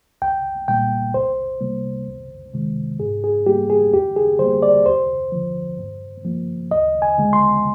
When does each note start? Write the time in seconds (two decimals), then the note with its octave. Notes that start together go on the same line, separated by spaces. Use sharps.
0.22 C2 G5
0.68 A#2 G3 A#3 G5
1.14 C2 C5
1.61 C3 G3 A#3
2.07 C2
2.54 C3 D#3 G#3
3.00 G#2 G#4
3.24 G#4
3.47 G3 A#3 G4
3.70 G#4
3.93 D#2 G4
4.16 G#4
4.39 D3 G3 A#3 C5
4.63 D5
4.85 D#2 C5
5.32 D3 F3
5.79 G2
6.24 F3 A#3
6.71 D2 D#5
7.02 G#5
7.18 D3 G#3
7.33 C6